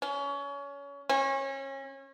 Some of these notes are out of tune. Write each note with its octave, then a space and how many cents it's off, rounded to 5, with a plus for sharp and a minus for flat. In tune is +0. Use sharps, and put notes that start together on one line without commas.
C#4 +25
C#4 -30